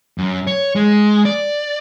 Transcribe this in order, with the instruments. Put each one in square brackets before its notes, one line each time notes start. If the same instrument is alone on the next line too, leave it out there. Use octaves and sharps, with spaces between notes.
[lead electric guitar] F#2
C#5
G#3
D5